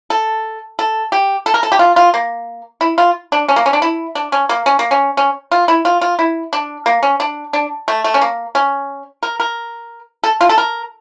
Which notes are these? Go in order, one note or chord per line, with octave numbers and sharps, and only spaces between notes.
A4
A4
G4
A4
A#4
A4
G4
F4
F4
A#3
E4
F4
D4
C#4
A#3
C#4
D4
E4
D4
C#4
A#3
C#4
A#3
C#4
C#4
F4
E4
F4
F4
E4
D4
A#3
C#4
D4
D4
A3
A3
C#4
A#3
C#4
A#4
A#4
A4
F4
A4
A#4